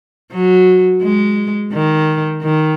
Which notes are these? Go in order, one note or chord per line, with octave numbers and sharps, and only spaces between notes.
F#3
G#3
D#3
D#3